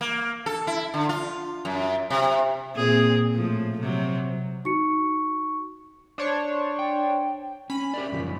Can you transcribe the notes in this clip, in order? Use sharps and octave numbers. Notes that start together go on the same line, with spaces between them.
A#3
A4
E4
D3
F4
F#2
C3
A#2 C4 G#4
A2 F3
C3 F#3
D#4 F#4 C#6 C#7
D4 C5 C#5
G5
C#4 B5
G4 A#4 D5
F#2 C#3 F3